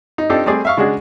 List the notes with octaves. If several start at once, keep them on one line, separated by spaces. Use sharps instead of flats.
D#4
C4 D4 D#4 F4 G4 A4
G3 A3 C4 G#4 D5
E5 F5 C#6
C#3 G#3 D4 F#4 G#4